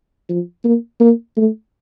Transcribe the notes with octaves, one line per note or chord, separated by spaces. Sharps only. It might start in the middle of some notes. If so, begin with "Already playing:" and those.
F3
A#3
A#3
A3